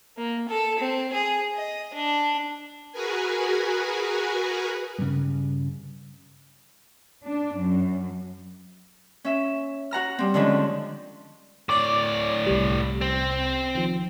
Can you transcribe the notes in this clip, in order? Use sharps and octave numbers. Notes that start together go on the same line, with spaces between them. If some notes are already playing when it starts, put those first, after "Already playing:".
A#3
A4
C4
G#4
D#5
D4
F#4 G#4 A#4 B4 G#5
G2 C#3
D4
F#2
C#4 E5
F#4 F#5 A#5 F6
G3 C4
D3 D#3 F3 G#3 C#4
A2 C#5 D5 D6
C2 C3 G3
C4
D#3 F3